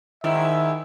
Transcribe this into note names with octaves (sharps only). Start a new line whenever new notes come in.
G#2 D#3 E4 E5